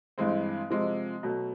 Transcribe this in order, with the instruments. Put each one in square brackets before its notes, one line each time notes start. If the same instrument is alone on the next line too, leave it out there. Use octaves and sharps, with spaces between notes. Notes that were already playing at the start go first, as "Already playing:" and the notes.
[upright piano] G2 E3 G#3 C4
C3 F3 G#3
B2 F#3 A3